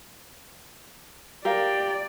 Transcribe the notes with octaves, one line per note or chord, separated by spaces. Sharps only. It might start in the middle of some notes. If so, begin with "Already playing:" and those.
G4 A#4 D5 F5